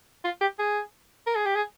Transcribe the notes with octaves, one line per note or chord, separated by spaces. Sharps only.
F4
G4
G#4
A#4
G#4
G4
G#4